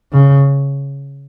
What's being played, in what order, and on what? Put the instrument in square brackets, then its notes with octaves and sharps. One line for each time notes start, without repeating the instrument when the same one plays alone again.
[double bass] C#3